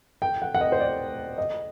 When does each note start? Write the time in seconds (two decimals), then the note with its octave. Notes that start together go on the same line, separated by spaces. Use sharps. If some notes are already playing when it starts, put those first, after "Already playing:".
0.22 G5
0.42 F#5
0.55 F#5
0.61 D#5
0.72 C5
0.80 D5
1.38 D#5